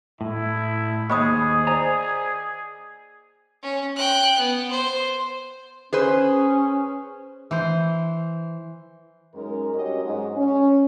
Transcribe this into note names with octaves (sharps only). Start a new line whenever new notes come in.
A2 E4
D#2 A#3 G#4 C5 C#5 D#5 B5 D#6
C5 D5 G#5 A#5
C#4
G5 F#6
B3
C5
C#4 G#4 B4 C5
E3 C5
F#2 G#3 C#4 D#4 A#4
G2 C#4 F#4 G4 C#5 D#5
G#2 F#3 G#3
C#4